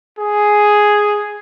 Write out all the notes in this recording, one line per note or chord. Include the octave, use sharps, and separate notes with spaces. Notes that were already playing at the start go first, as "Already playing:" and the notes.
G#4